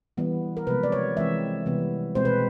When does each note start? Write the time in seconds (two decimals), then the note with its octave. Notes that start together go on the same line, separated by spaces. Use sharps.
0.17 E3 G3 B3
0.57 A#4
0.67 C3 F3 G#3 B3 B4
0.83 D5
0.92 C#5
1.17 E3 G#3 C4 E5
1.66 C3 E3 G3 B3
2.15 B2 G#3 C4 C5
2.25 B4